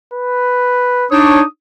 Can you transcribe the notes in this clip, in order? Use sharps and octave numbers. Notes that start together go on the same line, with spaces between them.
B4
D4 D#4 C#5 D#6